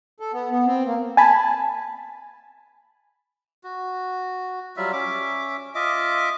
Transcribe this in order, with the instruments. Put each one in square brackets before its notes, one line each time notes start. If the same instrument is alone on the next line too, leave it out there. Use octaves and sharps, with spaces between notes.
[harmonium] A4
B3
B3
C4
A#3
[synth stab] G#5 A5 B5
[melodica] F#4
F#3 G3 F4 E5
C#4 E5 D6
F4 D#5 E5 D6